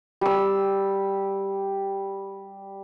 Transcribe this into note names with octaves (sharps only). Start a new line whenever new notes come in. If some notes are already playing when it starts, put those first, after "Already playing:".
G3 E6